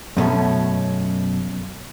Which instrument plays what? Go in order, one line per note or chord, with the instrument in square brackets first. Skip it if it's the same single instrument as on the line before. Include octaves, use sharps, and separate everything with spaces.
[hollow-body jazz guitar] F#2 B2 A3 C#4